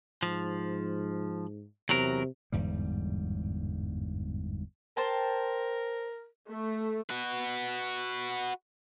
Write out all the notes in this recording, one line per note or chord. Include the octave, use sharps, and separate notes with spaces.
G#2 F3
E2 C3 F#3 A#4
G1 E2 G#2 G3
A#4 C5 G5 A5
A3
F#4 B4